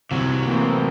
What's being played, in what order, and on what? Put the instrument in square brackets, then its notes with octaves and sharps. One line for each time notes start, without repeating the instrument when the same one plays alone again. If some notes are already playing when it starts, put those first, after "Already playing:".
[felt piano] C2 [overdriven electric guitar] C3 F#3
[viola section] E3 A3 C4 [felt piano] A#3